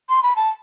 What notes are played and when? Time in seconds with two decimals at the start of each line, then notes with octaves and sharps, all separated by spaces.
0.09 C6
0.23 B5
0.36 A5